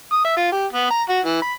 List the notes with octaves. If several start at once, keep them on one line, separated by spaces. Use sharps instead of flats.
D#6
E5
F4
G4
B3
A#5
F#4
E3
B5